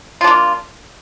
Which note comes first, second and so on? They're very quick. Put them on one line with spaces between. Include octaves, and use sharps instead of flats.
F4 D4 A#3